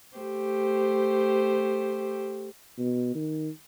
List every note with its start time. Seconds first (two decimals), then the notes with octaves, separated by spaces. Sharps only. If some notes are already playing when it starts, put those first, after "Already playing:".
0.17 A3 G4 C5
2.78 B2
3.15 D#3